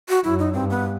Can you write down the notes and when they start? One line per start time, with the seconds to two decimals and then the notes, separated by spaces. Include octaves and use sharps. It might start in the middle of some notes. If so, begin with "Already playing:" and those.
0.09 F#4
0.24 F#2 E4
0.39 D#4
0.54 G2 C4
0.70 B3